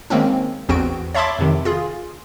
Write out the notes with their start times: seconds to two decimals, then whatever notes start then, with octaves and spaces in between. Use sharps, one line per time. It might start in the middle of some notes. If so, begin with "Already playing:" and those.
0.10 D#3 G#3 A#3 C4 C#4
0.69 A1 E2 B3 C4 F#4 D7
1.15 C#5 E5 A5 B5 C6 D6
1.39 F2 C3 D#3
1.65 F4 G#4